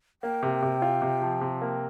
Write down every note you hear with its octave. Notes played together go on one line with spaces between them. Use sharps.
A#3 G5
C3
C3
F4
C3
F3
C3
A#3